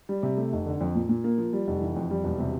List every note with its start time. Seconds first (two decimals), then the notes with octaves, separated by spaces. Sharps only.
0.09 G3
0.23 C3
0.37 A3
0.53 F1
0.66 D3
0.81 F2
0.95 A#2
1.09 A#2
1.24 A#3
1.38 F3
1.53 G3
1.67 F1
1.81 E3
1.96 F2
2.11 G3
2.24 E1
2.39 C3